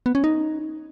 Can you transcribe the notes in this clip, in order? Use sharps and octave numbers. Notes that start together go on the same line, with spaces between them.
B3
C#4
D#4